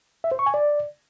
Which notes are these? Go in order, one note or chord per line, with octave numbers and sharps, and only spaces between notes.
E5
C5
C#6
G#5
D5